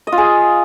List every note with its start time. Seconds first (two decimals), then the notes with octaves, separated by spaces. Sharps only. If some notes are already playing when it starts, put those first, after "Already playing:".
0.07 D#5
0.12 F4
0.18 G#4